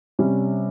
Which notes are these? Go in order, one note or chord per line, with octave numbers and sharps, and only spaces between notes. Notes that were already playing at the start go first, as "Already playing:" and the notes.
C3 G3 C#4